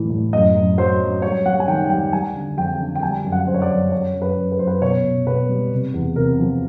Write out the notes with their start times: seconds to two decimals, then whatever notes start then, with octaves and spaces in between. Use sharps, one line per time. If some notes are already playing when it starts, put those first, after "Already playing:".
Already playing: A2 E3 G3
0.10 A2
0.33 F#2 D#5
0.55 F#2
0.78 F#3 C5
1.00 F#2
1.22 G3 C#5
1.45 G3 F#5
1.60 G#5
1.68 D#3 G5
1.90 G3 G5
2.13 G3 G#5
2.35 D3
2.57 F2 G5
2.79 D3
2.95 G5
3.02 G3 G#5
3.24 F#2
3.32 F#5
3.47 F#2 C5
3.54 C#5
3.62 D5
3.70 F#2
3.92 F#2 C#5
4.14 F#2
4.22 B4
4.37 F#2
4.52 B4
4.59 F#2 C5
4.67 B4
4.82 B2 C#5
5.04 B2
5.27 B2 B4
5.49 G3
5.72 C3
5.94 E2
6.16 C3 A#4
6.40 F3